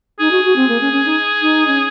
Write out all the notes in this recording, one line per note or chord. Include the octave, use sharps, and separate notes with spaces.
D#4 G#4
F#4
F#4
C4
A#3
C#4
C#4
D#4
D#4
C#4